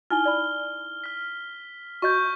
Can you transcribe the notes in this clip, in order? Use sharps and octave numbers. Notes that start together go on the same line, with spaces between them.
D#4 E4 G#5 F6 G7
D5 B5
F6 B6
F#4 D#5 C#6 G6